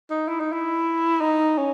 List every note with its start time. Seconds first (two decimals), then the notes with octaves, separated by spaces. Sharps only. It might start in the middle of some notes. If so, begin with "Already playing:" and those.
0.10 D#4
0.28 E4
0.40 D#4
0.52 E4
1.21 D#4
1.58 C#4